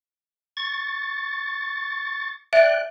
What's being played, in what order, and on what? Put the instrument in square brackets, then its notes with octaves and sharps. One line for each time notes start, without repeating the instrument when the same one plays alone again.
[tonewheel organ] C#6 A6
[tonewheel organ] D5 G5 F#6 [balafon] E5